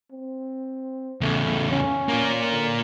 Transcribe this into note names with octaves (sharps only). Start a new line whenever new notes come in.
C4
E2 C#3 A3
C#4
A#3 F4
D3